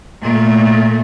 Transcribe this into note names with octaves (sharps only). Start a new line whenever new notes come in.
A#2 A3